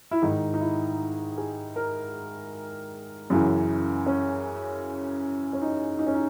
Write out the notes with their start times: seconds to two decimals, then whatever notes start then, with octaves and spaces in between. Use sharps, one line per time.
0.11 E4
0.22 G#2 D#3 D#4
0.54 D#4
0.61 E4
1.38 G#4
1.76 A#4
3.30 F#2 C#3 E3
4.06 C#4
5.53 C#4
5.62 D#4
5.99 D#4
6.07 C#4
6.14 D#4